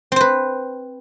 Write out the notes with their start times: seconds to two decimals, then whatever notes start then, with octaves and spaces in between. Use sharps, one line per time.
0.12 C4
0.16 C5
0.21 B4